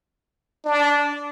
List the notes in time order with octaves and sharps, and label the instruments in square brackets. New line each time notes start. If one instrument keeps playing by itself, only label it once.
[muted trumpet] D4